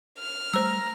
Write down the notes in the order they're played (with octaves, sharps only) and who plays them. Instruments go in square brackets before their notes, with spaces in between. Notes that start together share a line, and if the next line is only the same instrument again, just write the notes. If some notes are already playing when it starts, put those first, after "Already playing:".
[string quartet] F6
[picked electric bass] G3 A3 [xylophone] C5 E6 [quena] A#5